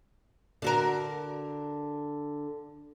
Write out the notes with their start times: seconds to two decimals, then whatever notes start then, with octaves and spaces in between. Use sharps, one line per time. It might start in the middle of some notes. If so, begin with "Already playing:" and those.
0.62 D3 F#4 A#4